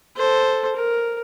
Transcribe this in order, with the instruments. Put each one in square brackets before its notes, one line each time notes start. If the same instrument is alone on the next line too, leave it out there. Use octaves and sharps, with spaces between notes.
[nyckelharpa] A4 C5
A#4